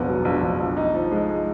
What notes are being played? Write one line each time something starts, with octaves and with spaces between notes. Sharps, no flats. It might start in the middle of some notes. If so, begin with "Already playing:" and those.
Already playing: F1 A#1 B3
F#3
A#1
A#1
A#1
D#4
F3
G#3